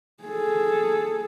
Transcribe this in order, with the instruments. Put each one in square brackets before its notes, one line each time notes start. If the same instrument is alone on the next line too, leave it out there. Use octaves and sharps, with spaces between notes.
[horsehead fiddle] G#4 A4